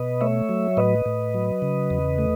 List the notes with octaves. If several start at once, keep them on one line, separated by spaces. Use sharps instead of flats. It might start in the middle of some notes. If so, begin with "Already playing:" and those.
Already playing: B2 B4 D#5
A3 C#5 E5
F#3
A2 B4 D#5
A2
F#3
C#3
E2
A3